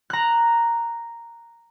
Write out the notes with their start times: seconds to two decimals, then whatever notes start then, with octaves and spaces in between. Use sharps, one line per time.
0.10 A#5 F#6